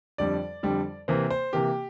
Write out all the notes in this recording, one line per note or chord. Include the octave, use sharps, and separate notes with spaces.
F2 D3 G3 D5
F2 D3 G3
C3 E3 A#3 C5
C5
C3 E3 A#3 G4